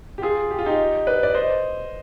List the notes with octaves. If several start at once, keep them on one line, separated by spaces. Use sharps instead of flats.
G4
F4 G#4
G4
F4
D#4 G4
B4 D5
D5
C5 D#5